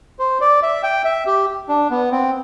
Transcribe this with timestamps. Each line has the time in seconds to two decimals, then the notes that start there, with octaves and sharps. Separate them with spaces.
0.19 C5
0.41 D5
0.63 E5
0.83 G5
1.05 E5
1.26 G4
1.69 D4
1.90 B3
2.12 C4